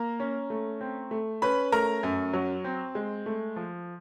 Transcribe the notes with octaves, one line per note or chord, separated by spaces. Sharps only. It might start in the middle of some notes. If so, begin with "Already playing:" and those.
Already playing: A#3 A#5
C#4
A3
C4
A3
C#4 B4 B5
A3 A#4 A#5
F#2
F#3
C4
G#3
A3
F3